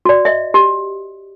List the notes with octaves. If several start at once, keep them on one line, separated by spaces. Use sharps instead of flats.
F#4 D5
D#5 E5
G4